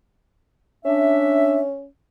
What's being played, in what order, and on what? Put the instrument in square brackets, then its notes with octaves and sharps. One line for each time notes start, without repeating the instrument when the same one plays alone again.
[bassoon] C#4 [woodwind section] D4 E5